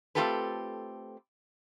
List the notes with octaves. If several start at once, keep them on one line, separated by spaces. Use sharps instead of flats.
A3 C4 F4 G4 A4 B4